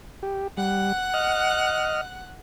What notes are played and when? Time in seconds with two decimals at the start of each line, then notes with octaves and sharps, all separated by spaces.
0.23 G4
0.57 G3 F#5 F#6
1.14 D#5 F6